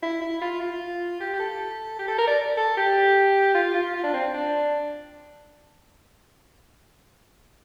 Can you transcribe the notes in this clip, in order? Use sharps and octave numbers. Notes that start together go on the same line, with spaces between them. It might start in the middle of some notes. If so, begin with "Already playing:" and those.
E4
E4
F4
F4
G4
G4
A4
G4
A4
A#4
D5
A4
G4
F4
F4
F4
D4
C4
D4